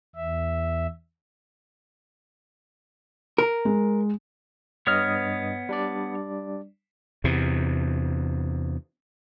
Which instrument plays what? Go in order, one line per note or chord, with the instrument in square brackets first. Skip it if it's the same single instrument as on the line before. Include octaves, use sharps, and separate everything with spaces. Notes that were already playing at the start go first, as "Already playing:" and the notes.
[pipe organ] E2 E5
[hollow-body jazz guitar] A#4
[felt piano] G#3
[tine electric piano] G2 D#5 D#6 [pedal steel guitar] B3 C#5 F6
[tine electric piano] G3 D4 D5
[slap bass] E2 C3